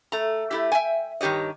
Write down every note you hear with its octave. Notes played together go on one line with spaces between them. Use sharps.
A3 A#5
A3 E4 G4
E5 G5 G#5
G2 D#3 G4 C#5 D#5